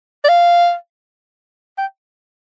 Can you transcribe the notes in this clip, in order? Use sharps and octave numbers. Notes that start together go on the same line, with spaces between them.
D5
F5
G5